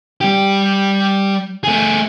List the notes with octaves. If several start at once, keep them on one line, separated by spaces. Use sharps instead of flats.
G3 G4
A3 G#4